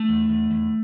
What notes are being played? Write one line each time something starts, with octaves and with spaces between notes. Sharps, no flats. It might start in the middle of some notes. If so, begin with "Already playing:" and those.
Already playing: A3
E2
E2
E2